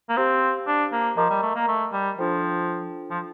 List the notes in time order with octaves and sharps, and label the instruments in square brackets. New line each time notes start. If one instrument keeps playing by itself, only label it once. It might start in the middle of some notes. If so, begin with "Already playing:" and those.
[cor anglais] A#3
[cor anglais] C4 [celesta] G4 C5 F5 C6
[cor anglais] D4
A#3
[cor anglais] F3 [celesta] A#4 D#5 A#5 D6
[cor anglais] G3
A3
A#3
A3
G3
[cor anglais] F3 [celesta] D4 F4 A4 C5 G5
[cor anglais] F3